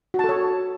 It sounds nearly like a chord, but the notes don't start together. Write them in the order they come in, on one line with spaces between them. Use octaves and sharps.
F#4 A5 A4 C#5